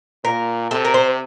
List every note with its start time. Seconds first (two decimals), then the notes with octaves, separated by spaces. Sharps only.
0.24 A#2 A#4
0.71 C3 A4
0.85 A#4
0.94 C5